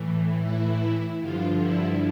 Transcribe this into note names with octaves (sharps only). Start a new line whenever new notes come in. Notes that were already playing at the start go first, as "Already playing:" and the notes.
Already playing: A2 E3
E4
G2 D3 F3 F4
E4